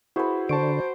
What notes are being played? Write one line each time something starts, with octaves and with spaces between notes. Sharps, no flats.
E4 F#4 G#4 B4 C5
D3 C5 A5 C#6 D7